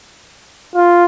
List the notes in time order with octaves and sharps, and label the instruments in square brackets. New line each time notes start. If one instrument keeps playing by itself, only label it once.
[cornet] F4